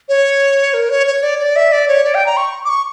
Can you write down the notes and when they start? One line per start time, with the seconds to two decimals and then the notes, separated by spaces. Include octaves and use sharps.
0.09 C#5
0.74 A#4
0.89 C#5
1.07 C#5
1.23 D5
1.39 D5
1.56 E5
1.72 D5
1.88 C#5
2.04 D5
2.15 G5
2.26 A#5
2.37 C#6
2.65 D6
2.69 C#6